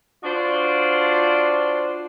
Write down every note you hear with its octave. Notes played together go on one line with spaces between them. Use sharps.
D4 F4 F#4 C5 D5